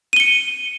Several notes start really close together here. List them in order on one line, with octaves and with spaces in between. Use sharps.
D#7 G7 C#7